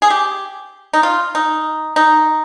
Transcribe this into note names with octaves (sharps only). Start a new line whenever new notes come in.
G#4
G4
D#4
F4
D#4
D#4